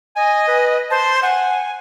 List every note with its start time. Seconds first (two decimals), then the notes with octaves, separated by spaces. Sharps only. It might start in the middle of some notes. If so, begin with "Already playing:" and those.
0.16 D#5 G#5
0.48 B4
0.91 C5 A5
1.23 F#5 G#5